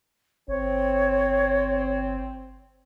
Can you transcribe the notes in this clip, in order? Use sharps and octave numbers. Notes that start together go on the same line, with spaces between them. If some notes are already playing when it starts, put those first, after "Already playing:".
G1 C4 C#5